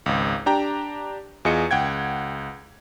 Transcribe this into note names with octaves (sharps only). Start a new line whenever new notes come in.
G#1 C#2
D4 G4 G5 A#5
E2 F4 G#4 D#5 C#7
C#2 F#5 G5 G#6